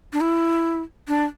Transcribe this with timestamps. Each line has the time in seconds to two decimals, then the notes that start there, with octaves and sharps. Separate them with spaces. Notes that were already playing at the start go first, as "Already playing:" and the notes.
0.13 D4
0.21 E4
1.08 D4